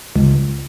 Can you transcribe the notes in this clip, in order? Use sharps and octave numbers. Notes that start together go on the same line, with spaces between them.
C#2